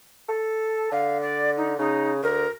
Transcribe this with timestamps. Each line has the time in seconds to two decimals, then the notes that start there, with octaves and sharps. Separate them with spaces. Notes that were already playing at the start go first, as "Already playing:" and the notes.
0.29 A4
0.92 D3 F5
1.22 D5
1.57 D#4
1.79 C#3 D#4
2.23 D2 A#4